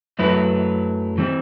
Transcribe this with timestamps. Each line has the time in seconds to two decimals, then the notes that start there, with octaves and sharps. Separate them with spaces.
0.19 F#2 F#3 A3 E4 B4
1.18 E3 G3 C4